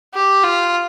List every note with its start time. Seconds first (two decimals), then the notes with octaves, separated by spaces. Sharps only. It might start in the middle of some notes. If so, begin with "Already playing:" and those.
0.14 G4
0.43 F4